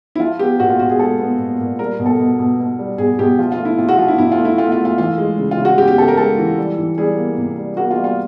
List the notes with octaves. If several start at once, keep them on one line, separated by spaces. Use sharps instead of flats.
E4
F3 F4
B3 G4
A#2 F#4
F4
A#2 F#4
G#4
G#3 A4
B3
A#2
A#2
G3 A#4
B2
A4
B2
B2
B2
G3
B2 G#4
B2 G4
F3 F4
F4
A3
E4
C3 F4
F#4
F3 F4
E4
C3 E4
F4
A3
E4
A3 F4
F4
A3
F4
E3 F4
G#3
C#3
F4
C#3
F#4
C#3 G4
G4
C#3 A4
A#4
G#3 A4
E3
G3
E3
G3 G#4
A#3
C3
G3
A#3 F#4
F4
G3
F4